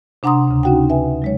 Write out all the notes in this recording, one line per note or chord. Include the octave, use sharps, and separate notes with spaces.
C3 D4 F#5 A#5 C6 D#6
D2 C#3
C#4 D#4 F#4 F#5 G5
B4 E5 G#5
F#3 G#3 C#5